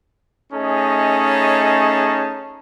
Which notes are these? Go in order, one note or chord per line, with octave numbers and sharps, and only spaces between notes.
A3 C#4 D#4 G#4 D#5 A5